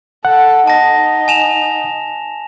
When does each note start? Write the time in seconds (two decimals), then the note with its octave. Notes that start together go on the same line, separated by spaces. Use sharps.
0.25 A4 F#5
0.67 D#4 A5 A#6
1.28 G#5 E7 F7